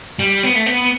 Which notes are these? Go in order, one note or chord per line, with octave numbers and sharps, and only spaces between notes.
G3
B3
A3
B3